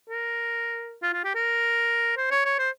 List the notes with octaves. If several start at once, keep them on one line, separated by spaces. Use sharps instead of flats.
A#4
F4
F4
G4
A#4
C5
C#5
C#5
C5